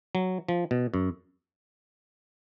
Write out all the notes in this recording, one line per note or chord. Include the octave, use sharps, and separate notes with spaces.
F#3
F3
B2
F#2